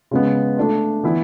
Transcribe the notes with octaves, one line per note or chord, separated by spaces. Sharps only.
C#3 G#3 B3
A3 D4 A4
E3 B3 E4